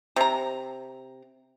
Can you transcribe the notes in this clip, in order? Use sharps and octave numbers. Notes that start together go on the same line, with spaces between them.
C3 A#5